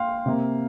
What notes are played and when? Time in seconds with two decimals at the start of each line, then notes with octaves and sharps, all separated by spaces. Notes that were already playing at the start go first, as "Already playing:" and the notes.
Already playing: A#3 F5 G5 C6
0.26 C3 A#3